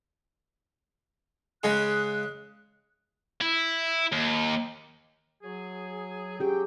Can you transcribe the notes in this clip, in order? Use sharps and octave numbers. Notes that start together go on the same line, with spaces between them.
C#3 G#3 F#6
E4
D#2
F#3 G#4
F#3 C#4 G4 G#4 G5